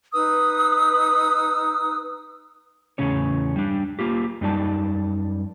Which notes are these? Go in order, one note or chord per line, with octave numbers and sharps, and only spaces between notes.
D#4 B4 D#6 E6
E2 A2 C#3 C#4 C#5
G3 D4
A#3 F4 G4
F#2 G3 D#4 D5 A5